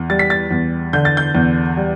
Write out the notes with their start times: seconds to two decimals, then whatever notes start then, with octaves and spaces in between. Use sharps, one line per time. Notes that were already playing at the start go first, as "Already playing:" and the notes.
Already playing: E2
0.10 G3 A6
0.19 B6
0.30 A6
0.51 E2
0.93 D3 G6
1.05 A6
1.17 G6
1.35 E2
1.77 G3